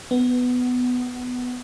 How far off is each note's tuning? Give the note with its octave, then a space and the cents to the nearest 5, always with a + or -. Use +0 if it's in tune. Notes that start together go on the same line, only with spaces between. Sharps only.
B3 +10